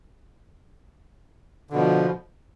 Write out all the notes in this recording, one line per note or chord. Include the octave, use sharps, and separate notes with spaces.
B2 D3 F3